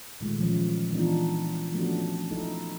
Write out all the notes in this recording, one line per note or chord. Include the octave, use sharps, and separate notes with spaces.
A#2 D#3 G#3 A3
E3 F3 C#4
E3 B3 D4 D#4 F4
F3 A3 B3 C#4 D4 F#4
D#4 E4 A4